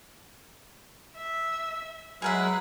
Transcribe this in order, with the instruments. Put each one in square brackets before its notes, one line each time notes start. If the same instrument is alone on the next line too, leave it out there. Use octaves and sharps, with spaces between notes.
[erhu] E5
[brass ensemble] F#3 G#3 B4 [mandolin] G#4 A#4 E5 [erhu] F#5